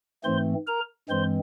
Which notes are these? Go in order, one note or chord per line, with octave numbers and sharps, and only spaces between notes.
G#2 E3 A3 C4 C5 C6
A#4 A#5
G2 E3 G#3 C4 C5 C6